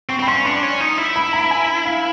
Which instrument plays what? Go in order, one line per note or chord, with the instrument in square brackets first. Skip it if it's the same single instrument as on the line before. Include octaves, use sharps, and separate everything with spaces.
[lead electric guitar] C4 [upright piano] C#6
[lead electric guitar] C4
[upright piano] B5
[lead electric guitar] C#4 [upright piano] C6
[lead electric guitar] D4 [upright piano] C6
[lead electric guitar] C#4
D#4
E4
[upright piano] B5
A#5
G#5
F5